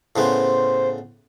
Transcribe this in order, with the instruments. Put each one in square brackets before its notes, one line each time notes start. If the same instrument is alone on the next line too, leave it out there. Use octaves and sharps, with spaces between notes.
[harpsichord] A2 C#3 B3 [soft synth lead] C5